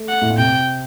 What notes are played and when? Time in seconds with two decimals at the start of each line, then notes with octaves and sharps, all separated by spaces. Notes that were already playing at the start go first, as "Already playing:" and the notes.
Already playing: A3
0.09 F#5
0.21 A2
0.30 A#2
0.38 C3 G5